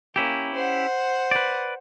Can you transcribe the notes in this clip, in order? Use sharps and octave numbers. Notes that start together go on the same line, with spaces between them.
A#3 C#4 E4 G4
C5 F#5
B4 D5